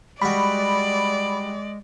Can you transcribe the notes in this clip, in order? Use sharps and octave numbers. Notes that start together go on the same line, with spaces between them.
G3 G#3 F#4 D5 B5